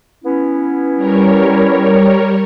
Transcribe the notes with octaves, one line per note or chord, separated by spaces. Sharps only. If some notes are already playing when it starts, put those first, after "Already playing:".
B3 C#4 E4
G3 A#4 C#5